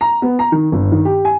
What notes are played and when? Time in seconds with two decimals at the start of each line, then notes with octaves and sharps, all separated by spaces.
0.01 A#5
0.22 B3
0.39 A#5
0.52 D#3
0.72 G1
0.92 D#3
1.05 G4
1.25 G#5